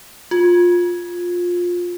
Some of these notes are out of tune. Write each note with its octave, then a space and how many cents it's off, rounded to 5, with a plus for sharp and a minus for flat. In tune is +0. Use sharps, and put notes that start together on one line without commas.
F4 +15